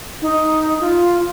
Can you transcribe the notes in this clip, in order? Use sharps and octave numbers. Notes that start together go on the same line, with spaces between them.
D#4
F4